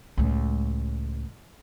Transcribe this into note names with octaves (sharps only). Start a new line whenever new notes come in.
C#2 A2